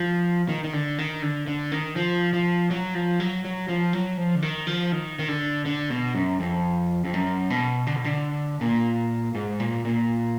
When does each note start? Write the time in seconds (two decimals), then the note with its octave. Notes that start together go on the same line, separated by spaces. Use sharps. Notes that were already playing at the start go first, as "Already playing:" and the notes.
Already playing: F3
0.49 D#3
0.64 D#3
0.73 D3
0.98 D#3
1.22 D3
1.47 D3
1.72 D#3
1.96 F3
2.33 F3
2.71 F#3
2.94 F3
3.20 F#3
3.45 F#3
3.68 F3
3.93 F#3
4.17 F3
4.35 D3
4.42 D#3
4.67 F3
4.92 D#3
5.19 D#3
5.28 D3
5.66 D3
5.90 B2
6.15 F#2
6.40 F2
7.05 F2
7.14 F#2
7.50 B2
7.87 D3
7.96 B2
8.04 D3
8.61 A#2
9.35 G#2
9.60 A#2
9.85 A#2